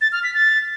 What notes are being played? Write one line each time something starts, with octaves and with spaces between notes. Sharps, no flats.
A6
F6
B6
A6